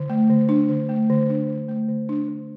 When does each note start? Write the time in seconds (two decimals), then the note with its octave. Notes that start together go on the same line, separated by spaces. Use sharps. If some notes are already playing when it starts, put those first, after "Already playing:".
Already playing: D3
0.10 A3
0.30 D3
0.49 D4
0.69 D3
0.89 A3
1.10 D3
1.29 D4
1.49 D3
1.68 A3
1.88 D3
2.09 D4
2.29 D3